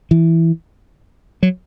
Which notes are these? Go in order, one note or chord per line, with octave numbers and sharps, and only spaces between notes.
E3
F#3